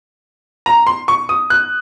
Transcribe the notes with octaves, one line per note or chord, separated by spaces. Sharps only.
A#5
C6
C#6
D#6
F#6